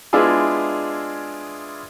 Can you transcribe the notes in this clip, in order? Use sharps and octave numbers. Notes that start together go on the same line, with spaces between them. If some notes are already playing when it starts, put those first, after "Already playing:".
G#3 B3 D4 E4 F4 G#4